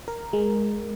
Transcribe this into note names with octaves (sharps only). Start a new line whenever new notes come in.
A#4
G#3